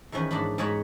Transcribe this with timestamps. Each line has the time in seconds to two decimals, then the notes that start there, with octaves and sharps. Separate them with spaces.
0.12 E2 D#3 F3 C#4 B4
0.31 G#2 D4 B5
0.58 G#2 G#3 C#5 F#5 A#5 B5